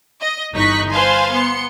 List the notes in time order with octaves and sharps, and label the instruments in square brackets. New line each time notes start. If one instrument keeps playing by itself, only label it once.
[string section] D#5
G1 E3 D#4 C#6 F#6 B6
B4 C5 F5 G#5 A5 C6
B3 C6 C#7